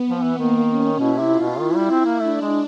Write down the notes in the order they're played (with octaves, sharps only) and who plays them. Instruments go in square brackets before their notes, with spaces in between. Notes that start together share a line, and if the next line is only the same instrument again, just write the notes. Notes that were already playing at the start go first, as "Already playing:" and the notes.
Already playing: [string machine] B3
[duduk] F3
E3
[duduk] D#3 [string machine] A#3
[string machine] C#4
[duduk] B2 [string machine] E4
[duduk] C3
[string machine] F4
[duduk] B2
[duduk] D#3 [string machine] E4
[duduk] G3
C4
A#3
[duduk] A3 [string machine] D4
[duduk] G#3